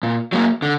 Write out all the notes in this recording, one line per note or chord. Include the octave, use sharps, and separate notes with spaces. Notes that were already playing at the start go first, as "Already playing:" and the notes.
A#2
F#3 A#3
D3